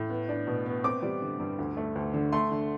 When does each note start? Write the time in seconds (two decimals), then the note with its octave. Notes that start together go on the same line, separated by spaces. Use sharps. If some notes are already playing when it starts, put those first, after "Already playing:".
Already playing: A2
0.09 B3
0.29 D4
0.47 B2
0.66 B3
0.84 C4 D6
1.03 G3
1.22 D3
1.40 G2
1.59 D2
1.77 A3
1.96 D2
2.14 D3
2.33 A3 C6
2.51 D3